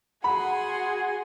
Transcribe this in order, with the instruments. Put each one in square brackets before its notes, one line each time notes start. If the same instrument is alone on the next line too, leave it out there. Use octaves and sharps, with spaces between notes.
[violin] F#4 C6 [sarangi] G#4 [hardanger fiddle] F#5 [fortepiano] B5